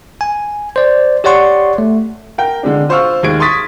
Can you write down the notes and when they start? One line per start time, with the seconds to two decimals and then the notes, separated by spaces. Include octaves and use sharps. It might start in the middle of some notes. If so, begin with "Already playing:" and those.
0.21 G#5
0.76 C5 D5
1.24 G4 C#5 D5 F#5 C6 C#6
1.78 A3
2.38 A#4 G5
2.63 D3 G#3 D4
2.89 F4 C5 F5 C#6 E6 F6
3.23 D#2 G#3 G#6 D7
3.40 C6 C#6 D#6 A6 B6